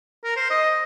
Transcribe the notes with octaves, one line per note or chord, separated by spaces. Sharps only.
A#4
C5
D#5